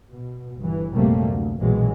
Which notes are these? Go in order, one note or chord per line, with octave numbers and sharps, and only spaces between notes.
B2
G1 E3
A#1 F#2 C3 G3 A3 A#3
D2
A#1 B2 E3 F#3 G#3